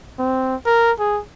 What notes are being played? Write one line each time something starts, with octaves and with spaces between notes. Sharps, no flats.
C4
A#4
G#4